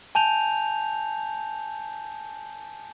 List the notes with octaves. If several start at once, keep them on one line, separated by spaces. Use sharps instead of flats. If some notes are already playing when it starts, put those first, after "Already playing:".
G#5 A5 G6 F7